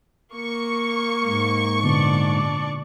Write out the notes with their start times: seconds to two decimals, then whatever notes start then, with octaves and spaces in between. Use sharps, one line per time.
0.35 A#3 C#6
1.25 G#2
1.84 A#2 D3 B3 D4 D5